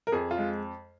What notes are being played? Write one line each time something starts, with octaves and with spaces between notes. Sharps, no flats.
A#4
F2 G#4
F4
G#3